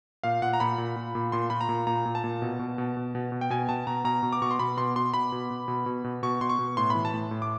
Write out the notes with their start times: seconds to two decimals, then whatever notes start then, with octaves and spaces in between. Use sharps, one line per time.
0.24 A#2 F5
0.42 A#2 F#5
0.53 A#5
0.60 A#2 B5
0.78 A#2
0.96 A#2
1.15 A#2
1.32 A#2 C6
1.50 A#2 B5
1.61 A#5
1.69 A#2
1.87 A#2 A#5
2.05 A#2
2.15 A5
2.24 A#2
2.42 B2
2.59 B2
2.78 B2
2.97 B2
3.15 B2
3.32 B2
3.41 G5
3.50 B2 G#5
3.69 B2 A5
3.87 B2 A#5
4.04 B2 A#5
4.23 B2
4.33 D6
4.42 B2 C#6
4.51 C6
4.59 B2 B5
4.77 B2 C6
4.96 B2 C6
5.14 B2 B5
5.32 B2
5.51 B2
5.68 B2
5.86 B2
6.04 B2
6.23 B2 C#6
6.41 B2 C6
6.49 C#6
6.59 B2
6.77 A2 C6
6.90 E3 B5
7.05 A5
7.14 A2
7.31 A2
7.42 D6